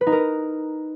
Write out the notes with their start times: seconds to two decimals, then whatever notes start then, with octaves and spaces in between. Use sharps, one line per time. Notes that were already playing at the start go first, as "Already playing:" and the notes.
0.01 B4
0.07 D#4
0.12 A#4